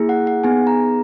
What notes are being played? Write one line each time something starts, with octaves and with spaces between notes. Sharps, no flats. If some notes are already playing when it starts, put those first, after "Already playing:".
Already playing: A#3 E4 G#4
F#5
F#5
B3 D#4 G#4 G#5
A#5